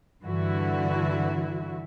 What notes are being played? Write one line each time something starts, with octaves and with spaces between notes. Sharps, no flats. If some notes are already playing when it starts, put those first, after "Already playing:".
G2 D3 E3 E4 F#4